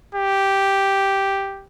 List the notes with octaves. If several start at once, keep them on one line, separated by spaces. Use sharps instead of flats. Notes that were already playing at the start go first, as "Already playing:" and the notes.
G4